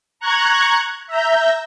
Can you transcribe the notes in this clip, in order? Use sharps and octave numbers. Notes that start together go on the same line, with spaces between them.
A#5 C#6 F#6 G#6
E5 A#5 G6